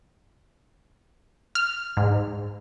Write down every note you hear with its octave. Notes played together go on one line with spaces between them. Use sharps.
F6
G#2